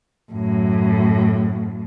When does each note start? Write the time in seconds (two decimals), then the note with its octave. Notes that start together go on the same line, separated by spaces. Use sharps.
0.32 F#2 A2